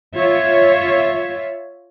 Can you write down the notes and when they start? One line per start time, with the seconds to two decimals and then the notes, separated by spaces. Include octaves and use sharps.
0.15 F4 C#5 E5